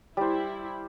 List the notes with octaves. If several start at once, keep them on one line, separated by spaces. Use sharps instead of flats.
G3 E4 C5